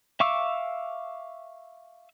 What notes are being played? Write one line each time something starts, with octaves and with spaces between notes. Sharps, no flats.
E5 F5 C#6 D6 E6